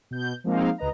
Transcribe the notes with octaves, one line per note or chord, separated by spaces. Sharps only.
B2 G6
F3 G#3 A#3 C4 D#4 F5
C#2 B4 D#5 A#5